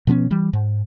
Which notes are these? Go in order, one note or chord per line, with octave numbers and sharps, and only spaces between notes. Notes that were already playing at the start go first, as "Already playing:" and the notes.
B2 F3 B3 C#4
E3 G3
G#2